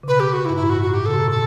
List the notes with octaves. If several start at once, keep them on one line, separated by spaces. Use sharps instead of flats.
C#3
B2 B4
G4
F#4
E4
G2
A2 E4
G2 F#4
F#4
A2 G4
C#3 A4
B2
A2
B2 A4